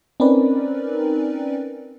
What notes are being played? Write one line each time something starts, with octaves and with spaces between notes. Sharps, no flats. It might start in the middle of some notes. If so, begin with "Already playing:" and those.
C4 C#4 D#4 A#4 B4 D5